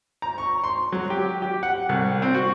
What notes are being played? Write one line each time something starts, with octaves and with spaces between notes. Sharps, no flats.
A#5
C#6
C6
F#3
G4
G4
F#5
C2
C4
F#4